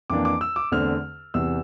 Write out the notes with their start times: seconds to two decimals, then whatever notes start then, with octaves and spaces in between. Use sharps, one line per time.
0.10 F2 E3 A#3 D4 D6
0.25 D6
0.41 E6
0.56 D6
0.72 E2 D3 A3 C4 F6
1.34 E2 C3 E3 E6